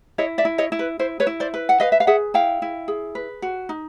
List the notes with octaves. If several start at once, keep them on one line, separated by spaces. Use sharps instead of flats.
E4 C#5 D#5
D5 E5
E4
C#5 D#5
E4
B4
E4 C5
B4 C#5
E4
C5 D5
B4
F#5
B4 D#5 F5
E5
F5
G#4 E5 F#5
E4 F5 G5
E4
G#4
B4
F#4
D#4